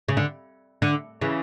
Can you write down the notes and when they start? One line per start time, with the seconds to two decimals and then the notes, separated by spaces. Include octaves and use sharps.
0.08 C#3
0.17 D3
0.82 D3
1.21 C#3 E3